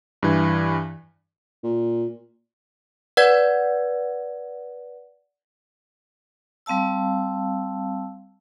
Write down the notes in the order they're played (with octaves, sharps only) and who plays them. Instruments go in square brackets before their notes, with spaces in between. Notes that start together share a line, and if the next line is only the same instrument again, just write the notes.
[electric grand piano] G2 E3
[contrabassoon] A#2
[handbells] B4 D5 F#5 G#6
[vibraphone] G3 C4 F5 A5 E6